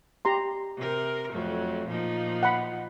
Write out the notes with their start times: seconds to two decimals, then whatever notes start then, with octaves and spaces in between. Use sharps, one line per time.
0.25 G4 A#5 C6
0.77 C3 A#4
1.33 F2 F#3 A3
1.87 A#2 F3 D#4
2.43 F#5 B5